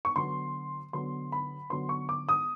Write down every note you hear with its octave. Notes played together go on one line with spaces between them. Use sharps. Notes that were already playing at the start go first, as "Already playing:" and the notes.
C#6
D3 F#3 B3 C6
D3 F#3 B3 C6
B5
D3 F#3 B3 C6
C#6
D6
D#6